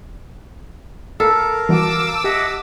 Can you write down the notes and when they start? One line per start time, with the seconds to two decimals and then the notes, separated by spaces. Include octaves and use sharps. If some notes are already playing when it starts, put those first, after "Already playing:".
1.20 A4 A#4 F5
1.69 E3 G3 F#4 A5 D6 E6
2.24 G4 D#5 E5 F#5